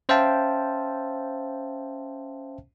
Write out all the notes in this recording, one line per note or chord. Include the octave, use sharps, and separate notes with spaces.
C#4 C5 E5 F5 G5 A5